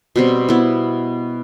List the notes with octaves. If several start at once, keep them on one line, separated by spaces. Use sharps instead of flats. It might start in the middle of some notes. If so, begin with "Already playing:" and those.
B2 G3 C4
B3 E4